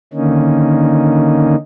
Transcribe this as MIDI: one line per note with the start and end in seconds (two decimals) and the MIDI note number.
0.14 1.56 50
0.14 1.56 51
0.14 1.56 58
0.14 1.56 61
0.14 1.56 63